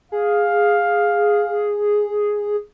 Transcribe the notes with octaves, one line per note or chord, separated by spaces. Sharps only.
G#4 F5